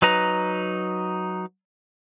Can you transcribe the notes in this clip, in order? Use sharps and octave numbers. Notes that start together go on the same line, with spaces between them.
F#3 D#4 B4 A#5